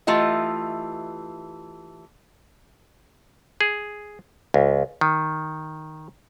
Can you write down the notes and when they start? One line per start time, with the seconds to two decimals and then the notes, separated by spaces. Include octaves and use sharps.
0.07 E3 A3 F4 G4 D#5
3.61 G#4
4.54 C#2
5.01 D#3